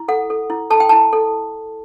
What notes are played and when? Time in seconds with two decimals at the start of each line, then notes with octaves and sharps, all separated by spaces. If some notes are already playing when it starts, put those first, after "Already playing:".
Already playing: E4
0.08 A4 F#5
0.30 A4
0.50 E4
0.70 A4 A5
0.80 G5
0.89 E4 A5
1.13 A4